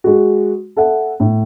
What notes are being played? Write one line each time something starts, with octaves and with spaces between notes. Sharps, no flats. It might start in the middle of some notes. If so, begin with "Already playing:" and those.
G#3 F#4
A4 E5 F#5
A2